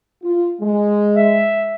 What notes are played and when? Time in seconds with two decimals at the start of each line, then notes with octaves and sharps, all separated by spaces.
0.23 F4
0.61 G#3
1.17 E5